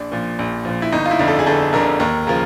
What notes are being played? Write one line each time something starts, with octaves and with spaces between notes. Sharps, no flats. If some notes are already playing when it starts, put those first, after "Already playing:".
Already playing: A#1 D4
A#2 F3
A#1
A#2 F3
E4
G1 D#4
F4
E4
F2 D3
A4
G#4
G1 A4
F2 D3 A#4
D#2 A#4
C#3 F3 A#4